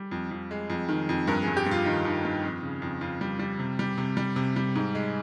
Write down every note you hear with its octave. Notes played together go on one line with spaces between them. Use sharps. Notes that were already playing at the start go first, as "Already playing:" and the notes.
Already playing: G3
F2
F2
G#3
F2
D#3
F2
G2 A#4
G#4
G2
G4
G2
F4
D#3 D#4
D#3
G2
F2
C#3
F2
F2 F4
G3
G3
C3
G3
C3
G3
C3
G3
G#2
G#3